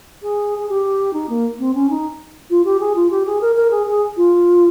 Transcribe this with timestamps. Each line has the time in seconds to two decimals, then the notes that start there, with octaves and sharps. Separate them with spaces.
0.23 G#4
0.58 G#4
0.69 G4
1.13 D#4
1.29 A#3
1.59 C4
1.74 C#4
1.90 D#4
2.50 F4
2.65 G4
2.80 G#4
2.96 F4
3.10 G4
3.26 G#4
3.41 A#4
3.56 A#4
3.71 G#4
3.87 G#4
4.17 F4